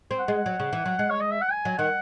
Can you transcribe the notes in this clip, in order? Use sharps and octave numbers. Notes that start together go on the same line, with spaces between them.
C4
F#5
G#3
F#3
C#3
E3
F#3
G#3
C#5
D#5
E5
F#5
G#5
F#3
D#3 F#5